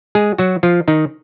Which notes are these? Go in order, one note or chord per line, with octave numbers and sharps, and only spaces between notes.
G#3 G#4
F#3 F#4
F3 F4
D#3 D#4